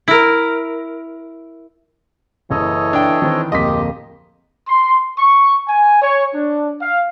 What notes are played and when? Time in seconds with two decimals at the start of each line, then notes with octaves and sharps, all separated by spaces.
0.08 E4 A#4
2.51 F#1 E3 A4 C#5 D#5 D#6
2.93 D4 G5
3.22 D#3 E3 C4
3.52 D1 F2 A#3 F4 G4 D#5 B6
4.68 C6
5.18 C#6
5.67 G#5
6.02 C#5
6.34 D4
6.80 F5